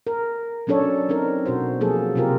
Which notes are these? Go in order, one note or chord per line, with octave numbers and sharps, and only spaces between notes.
A#4
F#3 C#4 D4 A4 C#5 D5
C4 D#4 A4 A#4
B2 F#4 C5
F3 F#3 A#3 G#4 A4
C3 C4 F4 G4 A#4